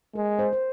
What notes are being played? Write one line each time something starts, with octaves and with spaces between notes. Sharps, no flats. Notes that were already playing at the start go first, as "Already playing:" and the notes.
G#3 A#4
C5
C5